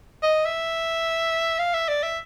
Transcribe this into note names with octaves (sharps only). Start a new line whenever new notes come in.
D#5
E5
F5
E5
D5
E5